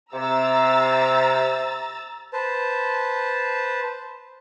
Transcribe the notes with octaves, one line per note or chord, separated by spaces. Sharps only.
C3 A#5 E6 A6
B4 C5 A5